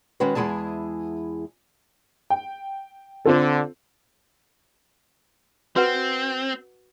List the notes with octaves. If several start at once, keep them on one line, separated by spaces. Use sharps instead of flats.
D#3 G#3 C#4 F#4 B4
E2 G#3 E4 G#4 A5
G5
D3 C4 F4 A4
C4 F#4 B4 F#5